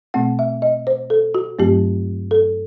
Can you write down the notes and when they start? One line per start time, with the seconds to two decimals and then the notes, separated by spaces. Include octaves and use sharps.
0.14 B2 A3 C4 F#5
0.39 E5
0.62 D#5
0.87 C5
1.10 A4
1.35 F#4
1.59 G2 F#3 A3 C4 G4
2.31 A4